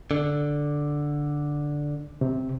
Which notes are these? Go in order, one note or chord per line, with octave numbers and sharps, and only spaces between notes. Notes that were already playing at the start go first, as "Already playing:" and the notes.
D3
C3